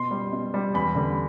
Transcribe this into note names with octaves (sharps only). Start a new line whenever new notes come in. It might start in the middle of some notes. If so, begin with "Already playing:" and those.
Already playing: B2 C6
G3
B2
G3
E2 B5
D3 G3